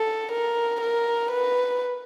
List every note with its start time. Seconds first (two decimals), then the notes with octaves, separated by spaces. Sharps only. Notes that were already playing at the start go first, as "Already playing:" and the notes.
Already playing: A4
0.32 A#4
0.81 A#4
1.31 B4